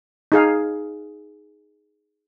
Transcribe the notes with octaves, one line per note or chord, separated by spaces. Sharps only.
D#4 G#4 F5